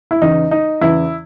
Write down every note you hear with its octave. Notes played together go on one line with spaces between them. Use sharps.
E4
E2 C#3 E3 D#4
D#4
E2 C#3 E3 E4